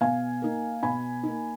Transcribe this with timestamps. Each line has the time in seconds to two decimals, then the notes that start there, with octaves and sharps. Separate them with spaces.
0.01 B2 F5 G#5
0.42 A#3 D#4
0.83 B2 G#5 B5
1.23 A#3 D#4